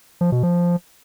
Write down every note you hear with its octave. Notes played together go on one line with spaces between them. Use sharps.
F3
B2
F3